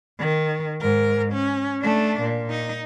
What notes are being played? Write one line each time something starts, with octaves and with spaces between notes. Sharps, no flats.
D#3
G#2 A#4
C#4
A3 D4
A#2
D#4